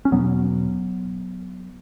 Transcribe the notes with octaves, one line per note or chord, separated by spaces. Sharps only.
C#4
E2 B2 F#3 B3